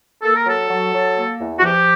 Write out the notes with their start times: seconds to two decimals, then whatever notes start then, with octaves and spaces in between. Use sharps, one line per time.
0.22 A#3 A4
0.36 A#4
0.46 F#3 A4
0.70 F#3
0.94 F#3
1.17 A#3
1.41 E2
1.59 F#4
1.64 F3 G4